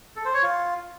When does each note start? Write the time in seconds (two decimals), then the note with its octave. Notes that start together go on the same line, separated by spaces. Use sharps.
0.16 A4
0.25 C5
0.34 C#5
0.43 F4